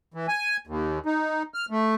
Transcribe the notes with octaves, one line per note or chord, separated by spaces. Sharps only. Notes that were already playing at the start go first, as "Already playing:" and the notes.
E3
G#5
D#2
D#4
F6
A3